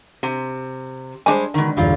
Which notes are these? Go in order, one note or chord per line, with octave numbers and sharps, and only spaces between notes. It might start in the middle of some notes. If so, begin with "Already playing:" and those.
C3
G3 G#3 D4 C5 D5 G#5
B2 D3 D#3 G#3
B1 E2 G2 A#2 G3 F4